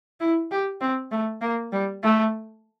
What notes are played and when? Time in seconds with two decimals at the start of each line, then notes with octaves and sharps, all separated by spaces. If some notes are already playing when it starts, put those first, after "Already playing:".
0.20 E4
0.51 G4
0.81 C4
1.11 A3
1.42 A#3
1.72 G3
2.03 A3